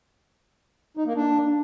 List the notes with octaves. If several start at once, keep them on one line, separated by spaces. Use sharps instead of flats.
D#4
A#3
D4